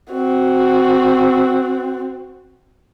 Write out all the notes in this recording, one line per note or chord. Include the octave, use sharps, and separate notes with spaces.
C4 F#4